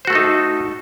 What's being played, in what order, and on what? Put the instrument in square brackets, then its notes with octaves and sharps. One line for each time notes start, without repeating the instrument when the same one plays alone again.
[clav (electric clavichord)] C5
F#4
A3
A4
D#4